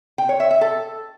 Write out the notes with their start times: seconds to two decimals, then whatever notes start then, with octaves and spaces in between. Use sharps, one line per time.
0.18 G5
0.29 C#5
0.40 E5
0.51 E5
0.61 A4